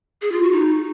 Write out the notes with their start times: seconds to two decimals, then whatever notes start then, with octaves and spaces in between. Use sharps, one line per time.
0.22 G#4
0.32 F4
0.42 F#4
0.52 D#4